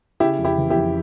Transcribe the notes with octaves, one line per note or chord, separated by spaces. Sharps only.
C#3 E4 G4
F2
E4 G4
E3
E4 G4
F2